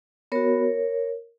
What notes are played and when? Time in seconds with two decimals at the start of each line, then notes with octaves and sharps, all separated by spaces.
0.32 B3 F#4 A#4 C#5